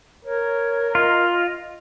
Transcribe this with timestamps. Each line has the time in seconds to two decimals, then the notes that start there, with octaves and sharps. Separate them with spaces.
0.25 A#4 C#5
0.95 F4 D#5